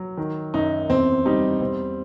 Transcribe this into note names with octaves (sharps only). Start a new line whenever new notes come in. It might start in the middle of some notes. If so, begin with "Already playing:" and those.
Already playing: F#3
D#3
F#2 D#4
E2 C4
G3 D#4
E2 C4